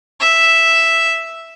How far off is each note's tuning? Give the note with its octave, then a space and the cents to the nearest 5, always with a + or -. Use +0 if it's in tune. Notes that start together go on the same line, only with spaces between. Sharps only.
E5 +0